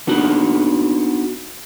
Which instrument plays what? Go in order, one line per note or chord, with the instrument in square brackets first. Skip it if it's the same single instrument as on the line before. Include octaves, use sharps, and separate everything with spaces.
[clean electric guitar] B3 D4 D#4 F#4